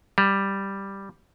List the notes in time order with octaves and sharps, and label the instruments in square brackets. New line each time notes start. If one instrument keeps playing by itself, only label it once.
[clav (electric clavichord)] G3